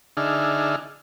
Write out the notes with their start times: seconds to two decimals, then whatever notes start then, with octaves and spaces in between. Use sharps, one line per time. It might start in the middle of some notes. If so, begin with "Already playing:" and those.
0.17 D3 D4 D#4 G#4 E5 F6